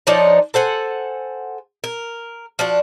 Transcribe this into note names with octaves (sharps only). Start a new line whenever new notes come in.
F3 D4 D#4 C#5
A4 C5 F#5 G#5
A#4
F3 D4 F#4